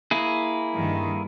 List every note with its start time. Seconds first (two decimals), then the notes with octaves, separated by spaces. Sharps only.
0.11 A#3 E4 G#4
0.76 G2 D#3